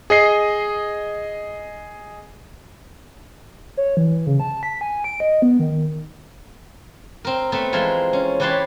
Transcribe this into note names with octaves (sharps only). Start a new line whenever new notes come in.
G#4 D#5 C7
C#5
E3
C#3
A5
B6
G#5
D7
D#5
B3
D#3
C4 A#4
A3 B3 C4
E3 F3 G#3 F4 A#4
C#4
E3 G4 B4 C#5 A5 C6